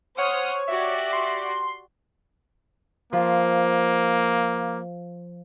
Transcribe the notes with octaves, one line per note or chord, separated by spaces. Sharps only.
C5 C#5 F#5 D#6 F6
F#4 G4 D5 E5
C6
F3 A#3